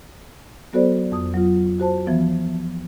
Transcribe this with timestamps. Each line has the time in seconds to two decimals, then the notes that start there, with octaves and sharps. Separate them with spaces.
0.73 F#3 B3 F#4 A4 C5 D5
1.12 F2 D#6
1.34 F#3 F4
1.80 F#4 C5 A5
2.07 E3 F3 B3